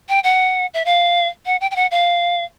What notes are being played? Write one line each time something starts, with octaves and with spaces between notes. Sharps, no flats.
G5
F#5
E5
F5
F#5
G5
G5
F#5
F5